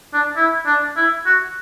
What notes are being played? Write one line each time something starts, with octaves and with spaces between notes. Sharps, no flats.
D4
E4
D4
E4
F#4